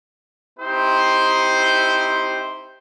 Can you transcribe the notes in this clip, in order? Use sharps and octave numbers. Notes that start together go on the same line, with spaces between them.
C4 D#4 E4 G4 C5